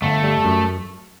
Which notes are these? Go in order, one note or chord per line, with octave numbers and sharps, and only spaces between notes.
G1 A3
G3
F#2